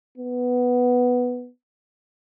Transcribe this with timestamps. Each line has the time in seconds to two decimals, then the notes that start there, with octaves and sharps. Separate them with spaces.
0.18 B3